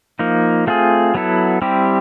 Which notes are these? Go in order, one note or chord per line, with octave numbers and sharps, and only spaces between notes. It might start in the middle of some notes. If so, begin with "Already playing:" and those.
F3 A#3 D#4
A3 C4 F4 G#4
F#3 B3 E4 A4
G3 C4 E4 G4